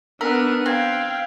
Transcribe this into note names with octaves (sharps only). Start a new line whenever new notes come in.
B3 D4 A#4 E6 B6
C4 F5 G5 F#6 G#6